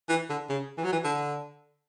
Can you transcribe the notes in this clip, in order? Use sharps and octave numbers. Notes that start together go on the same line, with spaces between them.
E3
D3
C#3
E3
F#3
E3
D3